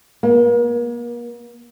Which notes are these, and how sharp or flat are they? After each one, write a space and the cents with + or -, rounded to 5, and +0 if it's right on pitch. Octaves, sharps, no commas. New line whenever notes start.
A#3 +40